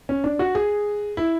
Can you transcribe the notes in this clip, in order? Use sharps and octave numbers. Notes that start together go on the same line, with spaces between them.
C#4
D4
F#4
G#4
E4